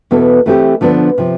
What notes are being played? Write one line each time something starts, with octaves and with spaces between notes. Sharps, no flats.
E2 B2 B3 E4 A4
E3 A3 C4 G4
D3 F3 B3 D4
C3 F3